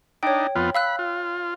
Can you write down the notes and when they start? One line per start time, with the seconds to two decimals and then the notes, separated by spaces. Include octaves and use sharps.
0.23 D4 D#4 C#5 G5
0.56 F2 B3 F4
0.75 F5 B5 E6 F#6
0.99 F4